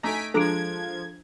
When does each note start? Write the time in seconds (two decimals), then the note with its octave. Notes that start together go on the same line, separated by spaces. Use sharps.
0.03 A3 D#4 G#5 A#5 B6 D7
0.34 F3 G#3 D4 A4 A#5 D6 G#6 D7